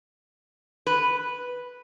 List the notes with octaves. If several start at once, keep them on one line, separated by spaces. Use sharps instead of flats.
B4